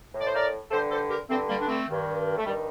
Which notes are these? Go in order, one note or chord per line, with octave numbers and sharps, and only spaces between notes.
A2
D5
C5
A#4 D5
G2 D3 A4 C5
A4 C5
G4 A#4
G2 D3 A3 C4
G3 A#3
D4
A3 C4
G2 D#3
A3
G2 D#3 G3